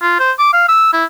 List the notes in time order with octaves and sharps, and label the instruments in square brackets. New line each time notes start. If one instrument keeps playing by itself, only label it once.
[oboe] F4
C5
D6
F5
E6
E4